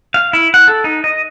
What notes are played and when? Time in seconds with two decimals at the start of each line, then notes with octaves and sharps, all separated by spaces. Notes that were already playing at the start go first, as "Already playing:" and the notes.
0.14 F5
0.33 E4
0.54 F#5
0.68 A4
0.84 D#4
1.04 D#5